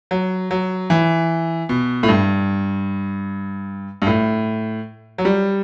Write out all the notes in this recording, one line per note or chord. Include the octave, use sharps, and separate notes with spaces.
F#3
F#3
E3
B2
A2
G2
G2
A2
F#3
G3